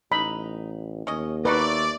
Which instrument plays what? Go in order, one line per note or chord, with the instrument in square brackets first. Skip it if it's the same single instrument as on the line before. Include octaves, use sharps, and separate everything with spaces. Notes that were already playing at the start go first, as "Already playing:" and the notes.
[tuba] A1 [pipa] D#4 [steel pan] B5
[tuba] D#2 [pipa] C#4 D#5
[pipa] A3 D#4 F#4 [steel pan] B4 [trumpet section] D5